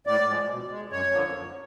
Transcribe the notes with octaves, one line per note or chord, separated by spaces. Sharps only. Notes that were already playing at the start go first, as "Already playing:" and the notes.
A2 D5
F3 G#3
B2
G#3
F#2 C#5
D3 F3 A#3
F#2